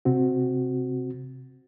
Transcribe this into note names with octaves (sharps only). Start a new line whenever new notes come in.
C3 C4 F#4